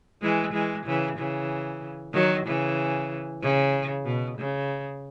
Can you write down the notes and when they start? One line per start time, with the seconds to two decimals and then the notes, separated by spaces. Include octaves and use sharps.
0.22 E3 G#3
0.53 E3 G#3
0.86 C#3 E3
1.17 C#3 E3
2.13 D#3 F#3
2.46 C#3 E3
3.42 C#3
4.05 B2
4.38 C#3